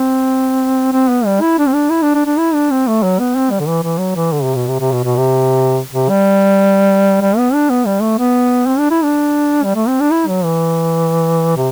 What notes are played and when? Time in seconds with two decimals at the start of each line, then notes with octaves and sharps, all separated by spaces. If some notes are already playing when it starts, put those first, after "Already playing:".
Already playing: C4
0.93 C4
1.10 B3
1.25 G3
1.41 E4
1.58 D4
1.67 C4
1.74 D4
1.90 E4
2.02 D4
2.14 D4
2.26 D4
2.38 E4
2.54 D4
2.71 C4
2.87 A3
3.03 F#3
3.19 B3
3.36 C4
3.51 G3
3.60 D3
3.68 E3
3.83 E3
3.99 F#3
4.15 E3
4.32 D3
4.44 C3
4.55 B2
4.68 C3
4.80 C3
4.92 B2
5.04 B2
5.17 C3
5.93 C3
6.09 G3
7.21 G3
7.37 B3
7.54 D4
7.70 B3
7.86 G3
8.02 A3
8.18 B3
8.67 C4
8.79 D4
8.90 E4
9.03 D4
9.63 G3
9.75 A3
9.88 C4
10.00 D4
10.11 E4
10.28 F#3
10.44 E3
11.57 C3